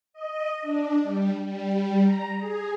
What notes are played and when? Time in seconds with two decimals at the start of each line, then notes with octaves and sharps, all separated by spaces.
0.13 D#5
0.61 D4
1.03 G3
1.45 G3
2.03 A#5
2.38 G#4